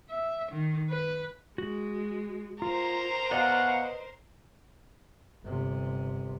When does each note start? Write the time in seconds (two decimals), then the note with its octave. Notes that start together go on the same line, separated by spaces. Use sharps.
0.10 E5
0.52 D#3
0.90 B4
1.58 G#3 F#4
2.62 F4 A#4 C5 A#5
3.31 B2 B4 D5 D#5 F5 F#5
5.44 G1 C3